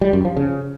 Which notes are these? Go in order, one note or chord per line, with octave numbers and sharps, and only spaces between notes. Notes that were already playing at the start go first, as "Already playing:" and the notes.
G3
F#2
F3
C#3